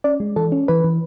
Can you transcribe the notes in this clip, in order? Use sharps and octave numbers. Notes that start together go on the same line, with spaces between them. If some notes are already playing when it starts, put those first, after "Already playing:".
C#4 D5
G#3
E3 A4
C#4
E3 B4
E3